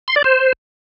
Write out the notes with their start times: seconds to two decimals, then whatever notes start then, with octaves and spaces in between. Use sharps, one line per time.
0.08 C6
0.16 D5
0.24 C5